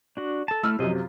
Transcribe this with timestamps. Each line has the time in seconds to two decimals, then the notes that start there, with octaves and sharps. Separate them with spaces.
0.17 D4 F#4
0.48 A4 A5
0.63 A3 E4 E6 F6
0.79 F#2 C3 F3 D#5
0.96 F4